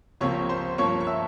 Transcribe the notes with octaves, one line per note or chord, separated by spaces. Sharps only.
C#2 C3 F3 A#3 C#5 C#6
C5 C6
G2 F3 A#3 C#4 C#5 C#6
C#6
E5 E6